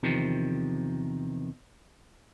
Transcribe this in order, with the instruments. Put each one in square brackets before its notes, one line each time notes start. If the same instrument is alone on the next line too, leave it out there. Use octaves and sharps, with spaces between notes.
[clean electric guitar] E2 C3 D#3 F3